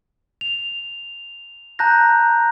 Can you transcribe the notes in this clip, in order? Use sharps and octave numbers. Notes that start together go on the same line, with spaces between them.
F7
A5 A#5 F#6 G6 A#6